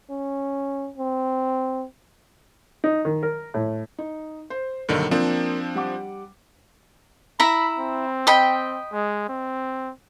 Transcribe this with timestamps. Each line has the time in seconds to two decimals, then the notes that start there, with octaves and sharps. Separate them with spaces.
0.10 C#4
0.98 C4
2.84 D#4
3.05 D#3
3.23 A#4
3.54 A2
3.98 D#4
4.50 C5
4.89 B1 G2 D3 D#3 A#3
5.11 F3 A#3 C4 D4
5.75 G3 F#5 D6
7.40 E4 E5 A#5 B5
7.78 C4
8.27 D#5 G5 B5
8.93 G#3
9.29 C4